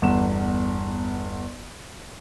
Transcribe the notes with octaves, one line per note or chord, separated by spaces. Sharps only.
G1 E2 F#5 E7